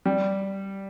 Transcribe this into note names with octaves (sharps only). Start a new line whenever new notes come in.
G3